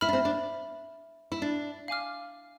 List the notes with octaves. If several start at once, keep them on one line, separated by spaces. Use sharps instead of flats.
E4 E5 B5 F6
D4
C4
D4
E4
D4
F5 G#5 D6 F6